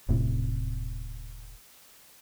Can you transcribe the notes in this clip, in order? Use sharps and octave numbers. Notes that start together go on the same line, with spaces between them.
D#1 A2 C3